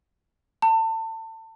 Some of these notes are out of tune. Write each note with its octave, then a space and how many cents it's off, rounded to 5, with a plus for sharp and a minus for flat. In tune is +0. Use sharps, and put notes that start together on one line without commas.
A5 +30